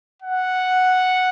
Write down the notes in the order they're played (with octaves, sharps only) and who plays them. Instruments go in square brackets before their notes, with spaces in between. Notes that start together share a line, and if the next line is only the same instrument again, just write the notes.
[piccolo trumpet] F#5